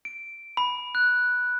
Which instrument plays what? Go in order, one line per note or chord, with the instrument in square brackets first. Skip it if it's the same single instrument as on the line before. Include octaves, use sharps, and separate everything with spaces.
[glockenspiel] D7
B5
F#6